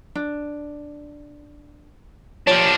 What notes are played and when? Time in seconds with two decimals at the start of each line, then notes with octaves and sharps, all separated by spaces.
0.15 D4
2.47 F3 D4 G4 C#5